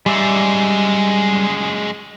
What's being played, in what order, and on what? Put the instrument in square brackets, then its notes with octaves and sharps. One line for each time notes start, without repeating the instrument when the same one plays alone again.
[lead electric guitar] F#2 G#3 [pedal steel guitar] G3 D5 E5